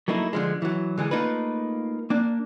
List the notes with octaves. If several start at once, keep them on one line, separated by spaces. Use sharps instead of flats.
F#3 A3 A#3 D#4 E4
D3 F3 G#3
E3 F#3
D3 E3 G#3 G#4
A3 A#3 D#4 F4 B4
A#3 D4